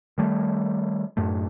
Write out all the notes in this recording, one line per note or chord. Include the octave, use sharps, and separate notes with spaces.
D#3 G3 A3
F#2 A2 A3